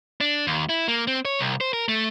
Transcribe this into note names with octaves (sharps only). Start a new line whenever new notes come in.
D4
D#2
E4
A#3
C4
C#5
C2
C5
A#4
A3